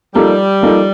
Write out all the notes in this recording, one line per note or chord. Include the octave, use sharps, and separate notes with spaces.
F3 G3 A#3 D#4 A4
F3 A#3 D#4 A4